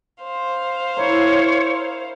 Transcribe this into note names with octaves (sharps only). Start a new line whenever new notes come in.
C5 F5
E4 A#4 C#5